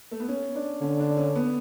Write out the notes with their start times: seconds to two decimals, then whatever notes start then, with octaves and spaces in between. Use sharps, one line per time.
0.11 A3
0.20 B3
0.28 C#4
0.55 D4
0.81 D3 C#4
1.00 D4
1.17 C#4
1.36 B3